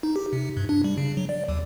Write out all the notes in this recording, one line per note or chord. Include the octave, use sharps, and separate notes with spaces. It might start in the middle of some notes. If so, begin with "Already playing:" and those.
D#4
G4
C3
G2
D4
G3
C#3
F#3
D5
D#2